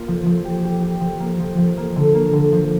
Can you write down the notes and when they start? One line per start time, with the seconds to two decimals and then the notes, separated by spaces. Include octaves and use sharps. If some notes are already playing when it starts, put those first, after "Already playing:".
Already playing: A#3 F4
0.08 F3
0.26 F3
0.45 G4
0.64 G4
0.83 G4
1.01 F3
1.20 A#3
1.40 F3
1.58 F3
1.77 A#3
1.96 D3
2.15 A#3
2.33 D3
2.53 F3